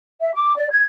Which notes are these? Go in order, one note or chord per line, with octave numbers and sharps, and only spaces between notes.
E5
D6
D5
G#6